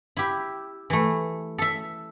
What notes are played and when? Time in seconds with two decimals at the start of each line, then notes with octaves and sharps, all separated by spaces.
0.17 E4 G4
0.90 E3 A3
1.58 A4 E5